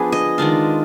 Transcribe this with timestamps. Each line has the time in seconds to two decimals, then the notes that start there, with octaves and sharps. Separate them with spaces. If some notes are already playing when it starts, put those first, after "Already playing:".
Already playing: F3 B3 D4 G#4 B4
0.12 D#5
0.38 D#3 G#3 D4 F4